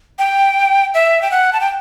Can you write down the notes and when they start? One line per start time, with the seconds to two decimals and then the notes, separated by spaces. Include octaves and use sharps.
0.19 G5
0.94 E5
1.22 G5
1.31 F#5
1.53 A5
1.61 G5